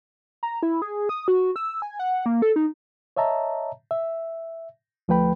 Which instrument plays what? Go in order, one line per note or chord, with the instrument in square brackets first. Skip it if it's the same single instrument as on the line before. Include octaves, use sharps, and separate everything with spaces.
[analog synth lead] A#5
E4
G#4
D#6
F#4
E6
G#5
F#5
A#3
A4
D#4
[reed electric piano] C#5 D#5 E5 A5 A#5
E5
D2 F3 A3 B4 G5 B5